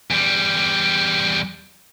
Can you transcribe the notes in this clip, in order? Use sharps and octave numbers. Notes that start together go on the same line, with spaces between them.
E2 G3